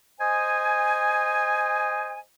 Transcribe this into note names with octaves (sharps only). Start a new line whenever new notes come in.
C5 D#5 G#5